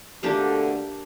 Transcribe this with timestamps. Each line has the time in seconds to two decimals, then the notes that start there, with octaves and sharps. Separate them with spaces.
0.23 B2 D3 A3 A#3 D4 G4